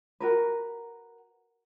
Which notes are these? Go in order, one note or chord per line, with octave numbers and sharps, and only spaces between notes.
F#4 A#4 B4